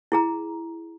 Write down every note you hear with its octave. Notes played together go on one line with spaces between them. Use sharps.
E4 G#4 A#5